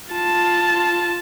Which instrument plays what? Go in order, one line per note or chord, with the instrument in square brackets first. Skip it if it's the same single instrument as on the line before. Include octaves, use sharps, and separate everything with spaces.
[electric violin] F4 A5